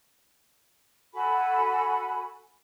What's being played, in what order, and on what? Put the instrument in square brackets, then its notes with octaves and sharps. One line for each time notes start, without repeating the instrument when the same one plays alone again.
[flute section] F#4 A4 G#5 B5